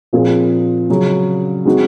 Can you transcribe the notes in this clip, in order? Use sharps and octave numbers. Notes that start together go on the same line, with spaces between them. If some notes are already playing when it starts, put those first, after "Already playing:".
A#2 F3 C4 F4 G#4
C#3 F#3 C#4 G#4
G#3 C4 D#4 F#4